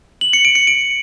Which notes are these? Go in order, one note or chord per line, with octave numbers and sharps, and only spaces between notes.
F#7
C#7
D7
C#7
D7